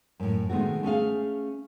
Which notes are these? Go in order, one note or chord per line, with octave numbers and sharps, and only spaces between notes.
F#2 A2
C3 D#3 G#3 A3 B3 F#4
A3 C#4 G#4 F5